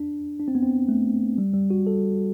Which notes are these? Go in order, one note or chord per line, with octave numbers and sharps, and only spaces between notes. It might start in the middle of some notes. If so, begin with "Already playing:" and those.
Already playing: D4
D4
C4
B3
C4
A3
G3
G3
F#4
A4